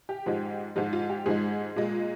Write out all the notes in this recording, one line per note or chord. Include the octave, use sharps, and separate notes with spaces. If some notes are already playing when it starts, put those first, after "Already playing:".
G4
G#2 F3 G#3
G#2 F3 G#3 F4
F4
G4
G#2 F3 G#3 G#4
A#2 G#3